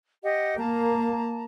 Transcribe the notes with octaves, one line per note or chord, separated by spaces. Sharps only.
G4 D#5 F#5
A#3 A5 A#5